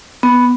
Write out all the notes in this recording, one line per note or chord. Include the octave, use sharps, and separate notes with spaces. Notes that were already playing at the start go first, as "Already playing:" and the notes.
B3